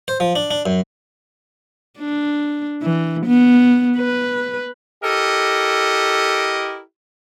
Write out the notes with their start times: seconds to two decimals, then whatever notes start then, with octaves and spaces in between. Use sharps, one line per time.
0.08 C5
0.20 F3
0.36 D4
0.51 D4
0.66 F#2
1.99 D4
2.82 E3
3.26 B3
3.97 B4
5.04 E4 G4 A4 A#4 D#5